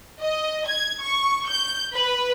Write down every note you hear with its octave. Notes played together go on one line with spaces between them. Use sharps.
D#5
G#6
C#6
G6
B4